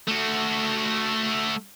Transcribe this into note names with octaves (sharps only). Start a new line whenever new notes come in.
A3 F#4